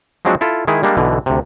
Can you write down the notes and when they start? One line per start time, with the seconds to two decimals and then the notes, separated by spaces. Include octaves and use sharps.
0.25 F3 F#3 G#3 C4 D4 F#4
0.41 E4 F4 A4
0.67 D#3 G#3 E4 G#4
0.83 G3 G#3 A#3 D4
0.97 B1 B2 D3 E3
1.26 D2 C3